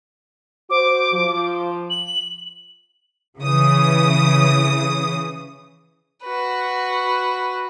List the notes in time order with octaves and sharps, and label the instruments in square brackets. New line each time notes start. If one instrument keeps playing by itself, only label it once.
[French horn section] F#4 C5 [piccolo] D6
[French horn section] F3
[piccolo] F#7
[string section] C#3 E3 D#6
[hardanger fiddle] F#4 B4